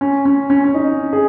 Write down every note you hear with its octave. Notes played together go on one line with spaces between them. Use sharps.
C#4
C#4
C#4
C#4
D#4
G#4